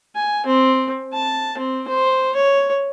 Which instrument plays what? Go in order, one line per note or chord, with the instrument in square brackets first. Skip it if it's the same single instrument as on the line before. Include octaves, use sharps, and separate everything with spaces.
[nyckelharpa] G#5
C4
A5
C4
C5
C#5